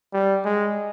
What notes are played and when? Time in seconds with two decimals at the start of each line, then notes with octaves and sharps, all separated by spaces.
0.14 G3
0.45 G#3